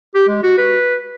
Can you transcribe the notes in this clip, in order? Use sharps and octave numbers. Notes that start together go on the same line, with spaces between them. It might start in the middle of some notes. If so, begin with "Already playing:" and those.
G4
G#3
F#4
B4